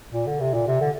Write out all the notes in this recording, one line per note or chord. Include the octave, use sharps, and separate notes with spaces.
A#2
D3
C3
A#2
C3
D3